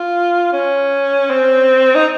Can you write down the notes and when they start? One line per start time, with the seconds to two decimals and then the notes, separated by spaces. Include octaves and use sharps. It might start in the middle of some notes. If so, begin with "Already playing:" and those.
Already playing: F4
0.53 C#4
1.30 C4
1.95 D#4